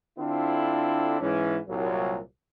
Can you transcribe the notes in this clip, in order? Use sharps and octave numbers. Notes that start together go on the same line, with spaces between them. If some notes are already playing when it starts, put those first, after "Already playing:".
D3 C4 D4 E4 F4 A4
G#2 E3 C#4
C2 A#2 F#3